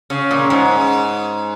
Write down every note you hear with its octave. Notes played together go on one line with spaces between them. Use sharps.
C#3
A#2
G#2